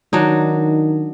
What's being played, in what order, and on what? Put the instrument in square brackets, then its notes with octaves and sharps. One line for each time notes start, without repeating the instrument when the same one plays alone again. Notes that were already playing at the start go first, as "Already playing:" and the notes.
[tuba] D#3 [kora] F#3 D4 D#4